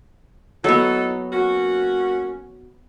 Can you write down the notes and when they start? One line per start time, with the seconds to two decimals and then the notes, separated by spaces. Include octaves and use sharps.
0.64 A2 F#3 B3 D#4 A4
1.33 A#3 C#4 F#4